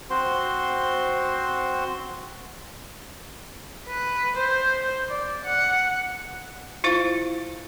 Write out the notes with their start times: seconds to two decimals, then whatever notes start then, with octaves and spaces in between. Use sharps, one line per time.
0.10 C4 F#4 C5 C6
3.87 B4
4.36 C5
5.10 D5
5.44 F#5
6.84 E4 F4 C5 F5